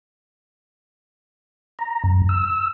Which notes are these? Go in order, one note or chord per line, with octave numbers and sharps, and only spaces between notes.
A#5
F#2
E6